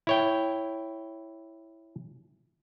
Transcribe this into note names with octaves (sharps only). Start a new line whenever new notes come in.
E4 C#5 G5